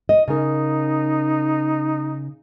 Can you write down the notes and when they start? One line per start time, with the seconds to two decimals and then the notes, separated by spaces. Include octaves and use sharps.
0.09 D#5
0.28 C#3 D#4 A#4